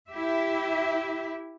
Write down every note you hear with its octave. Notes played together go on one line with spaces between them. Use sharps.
E4 G4 E5